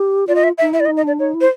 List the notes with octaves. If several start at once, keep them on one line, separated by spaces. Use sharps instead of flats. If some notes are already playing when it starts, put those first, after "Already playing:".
Already playing: G4
F4 D5
D#5
E5
E5
D#4
E4 E5
D5
D#5
D#4
D#5
D4 D5
D#4 C#5
E4
C5